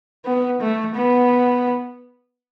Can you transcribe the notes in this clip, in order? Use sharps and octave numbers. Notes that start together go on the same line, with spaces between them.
B3
A3
B3